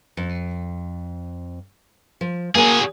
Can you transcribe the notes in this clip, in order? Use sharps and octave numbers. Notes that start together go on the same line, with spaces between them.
F2
F3
F#3 A#3 G#4 A#4 G#5